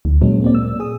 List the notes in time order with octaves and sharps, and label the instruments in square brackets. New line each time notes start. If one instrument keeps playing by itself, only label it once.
[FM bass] D2
[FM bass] A#2 [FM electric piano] F#3 G#3 C#4
[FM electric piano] A#3 C4 D5
E6
G#4 D#6